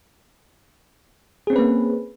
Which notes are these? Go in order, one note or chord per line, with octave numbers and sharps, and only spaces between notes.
A#3 C4 C#4 G#4 B4